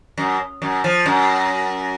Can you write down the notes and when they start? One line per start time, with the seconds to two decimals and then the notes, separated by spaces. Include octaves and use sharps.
0.18 F#2
0.62 F#2
0.84 F3
1.06 F#2